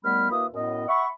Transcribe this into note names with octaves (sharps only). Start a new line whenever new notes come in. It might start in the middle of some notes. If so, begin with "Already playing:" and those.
D#2 G3 A3 B3 B5 F6
D#2 A#3 F4 B4 E5 D#6
F#2 A2 B3 D#5
E5 F#5 B5 C#6